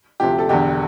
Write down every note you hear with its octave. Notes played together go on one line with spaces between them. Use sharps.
D2 C3 F3 G4
A4
E1 E2 D3 G4